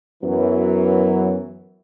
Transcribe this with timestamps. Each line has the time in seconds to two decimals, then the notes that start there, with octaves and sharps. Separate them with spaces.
0.23 F#2 E3 F#3 B3